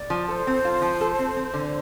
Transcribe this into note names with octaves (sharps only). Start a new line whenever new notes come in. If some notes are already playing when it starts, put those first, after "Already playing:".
Already playing: D5
F3
A4 C5
C4
F4
F3
A4
C4
C4
D3